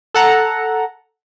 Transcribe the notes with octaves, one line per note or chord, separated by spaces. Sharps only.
A4 F#5 A#5